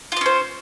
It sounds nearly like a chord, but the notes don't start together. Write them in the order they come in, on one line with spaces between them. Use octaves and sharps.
F4 D#5 C#4 C5